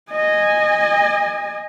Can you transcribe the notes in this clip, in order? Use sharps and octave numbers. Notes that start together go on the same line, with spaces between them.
D#5 G#5